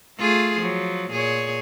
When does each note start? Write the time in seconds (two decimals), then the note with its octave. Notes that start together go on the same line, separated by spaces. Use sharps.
0.18 A3 F4 G#4
0.58 F3 F#3
1.11 A#2 G#4 C#5